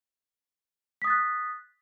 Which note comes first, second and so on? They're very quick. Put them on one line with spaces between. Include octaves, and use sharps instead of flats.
B6 D#6 A6 F#6